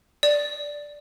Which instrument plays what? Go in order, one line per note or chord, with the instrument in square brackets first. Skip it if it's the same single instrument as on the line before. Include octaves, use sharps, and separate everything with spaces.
[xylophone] D5